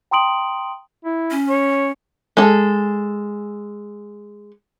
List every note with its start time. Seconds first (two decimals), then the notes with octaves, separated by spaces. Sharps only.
0.11 G5 A#5 C6 D#6 D7 F#7
1.05 E4
1.31 C#4
1.49 C#5
2.37 G#3 A4